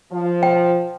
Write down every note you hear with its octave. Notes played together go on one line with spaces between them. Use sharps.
F3
G5